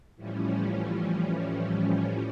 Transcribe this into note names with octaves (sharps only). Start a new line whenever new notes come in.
A2 E3 F3 G3 C#4